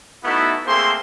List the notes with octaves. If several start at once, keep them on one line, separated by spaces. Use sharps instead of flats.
A3 B3 D#4 E4 F#4 A4
A3 A#3 C4 G#4 C5 C6